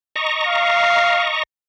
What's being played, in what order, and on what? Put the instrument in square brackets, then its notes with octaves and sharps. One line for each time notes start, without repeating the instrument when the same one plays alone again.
[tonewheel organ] D#5 A#5 C#6
[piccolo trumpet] F5